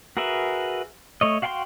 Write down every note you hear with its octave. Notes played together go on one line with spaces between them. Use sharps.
F#4 G#4 A#4 B4 E5
A3 C#5 D#5
F#4 F5 G5 G#5 C6